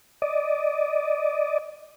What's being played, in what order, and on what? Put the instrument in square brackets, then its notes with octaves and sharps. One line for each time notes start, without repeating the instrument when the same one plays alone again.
[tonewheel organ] D5 D#5